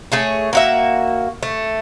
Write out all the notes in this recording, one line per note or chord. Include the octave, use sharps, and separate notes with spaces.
A3 G#4 C#5
A#3 F#4 E5
A3